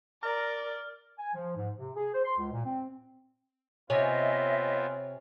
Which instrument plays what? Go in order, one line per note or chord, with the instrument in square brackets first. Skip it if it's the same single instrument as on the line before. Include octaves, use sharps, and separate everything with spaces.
[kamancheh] A#4 [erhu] D5 [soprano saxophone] A#5 [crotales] F6
[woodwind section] G#5
F3
G#2
C3
G#4
C5
C6
C#2
A#2
C4
[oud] C3 [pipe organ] B3 C4 F4 [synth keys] C#5 G#5 [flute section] D#5 E5